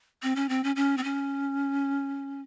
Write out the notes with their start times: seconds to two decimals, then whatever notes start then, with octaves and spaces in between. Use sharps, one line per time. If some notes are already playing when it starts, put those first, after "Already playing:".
0.23 C4
0.36 C#4
0.49 C4
0.64 C#4
0.76 C#4
0.97 C4
1.04 C#4